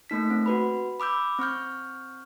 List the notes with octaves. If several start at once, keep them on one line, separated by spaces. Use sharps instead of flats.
A3 A#3 D#4 B6
C4
F#4 B4 B5
B5 D6 E6 G6
C4 C#6 F6 G6